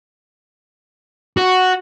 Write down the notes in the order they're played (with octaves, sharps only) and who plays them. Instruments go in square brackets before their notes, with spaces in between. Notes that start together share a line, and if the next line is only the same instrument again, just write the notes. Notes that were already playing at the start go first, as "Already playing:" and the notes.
[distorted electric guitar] F#4